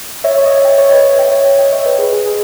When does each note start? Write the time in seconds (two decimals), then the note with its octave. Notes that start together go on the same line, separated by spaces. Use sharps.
0.24 C#5 E5
0.38 C#5 E5
0.46 D#5
0.51 C#5 E5
0.65 D#5 G5
0.78 C#5 E5
0.91 B4 D#5
1.05 C#5 E5
1.18 D#5 G5
1.31 C#5 E5
1.45 C#5 E5
1.59 D#5 G5
1.72 C#5 E5
1.85 B4 D#5
1.99 G#4 B4
2.12 G#4
2.26 G#4